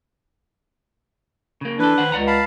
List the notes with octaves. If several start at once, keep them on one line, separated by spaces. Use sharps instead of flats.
C#3 A#3
E3 D4 A4 B4
D#3 C5 F#5
C#2 D5 F#5 A#5
F5 A5 B5